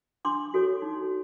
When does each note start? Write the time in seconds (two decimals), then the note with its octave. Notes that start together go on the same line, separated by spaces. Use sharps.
0.25 D4 C6 D6
0.54 F#4 A4 C#5
0.82 D#4